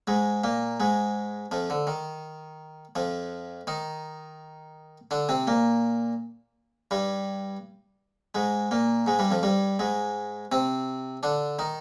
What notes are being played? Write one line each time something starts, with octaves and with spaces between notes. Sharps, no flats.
G#2 G#3
A#2 A#3
G#2 G#3
F2 F3
D3
D#3
F2 F3
D#3 D#4
D3 D4
C3 C4
A#2 A#3
G2 G3
G#2 G#3
A#2 A#3
G#2 G#3
G2 G3
F2 F3
G2 G3
G#2 G#3
C3 C4
D3 D4
D#3 D#4